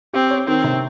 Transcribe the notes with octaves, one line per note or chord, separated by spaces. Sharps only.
C4 G4
C#5
D#3 C4
C3